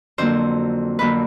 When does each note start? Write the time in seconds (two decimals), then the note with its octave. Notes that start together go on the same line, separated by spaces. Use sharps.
0.18 F2 D3 F#3 A#3 C5
0.99 F2 D3 F#3 A#3 B4